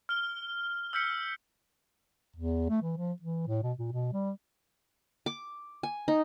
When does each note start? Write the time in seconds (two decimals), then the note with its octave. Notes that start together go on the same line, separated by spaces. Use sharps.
0.09 F6 G7
0.93 E6 F6 G6 B6 C#7
2.36 E2
2.69 A3
2.82 E3
2.97 F3
3.22 E3
3.47 A2
3.63 B2
3.79 A#2
3.92 B2
4.13 G3
5.26 D6
5.83 G#5
6.08 D#4